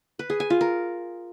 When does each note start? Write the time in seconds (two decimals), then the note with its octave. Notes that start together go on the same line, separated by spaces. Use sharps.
0.19 B4
0.30 G#4
0.40 G#5
0.50 F4
0.61 A#4